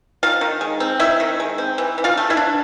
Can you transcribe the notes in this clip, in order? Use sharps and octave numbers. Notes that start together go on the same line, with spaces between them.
D#3 F4 F5
D#3
G#3
C4
D#3 E4 E5
D#3
G#3
C4
E3
E3
F4 F5
A3
E4 E5
D4